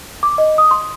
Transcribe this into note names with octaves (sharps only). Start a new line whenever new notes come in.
D6
D#5
D#6
C6